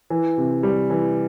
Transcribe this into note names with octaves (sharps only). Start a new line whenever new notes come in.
E3
C3
G3
E3